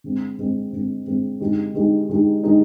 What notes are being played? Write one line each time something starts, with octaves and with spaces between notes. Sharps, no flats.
D3 G#3 C4
D3 G#3 C4
D3 G#3 C4
D3 G#3 C4
D3 G#3 D#4 G4
D3 G#3 D#4 G4
D3 G#3 D#4 G4
D3 G#3 D#4 G4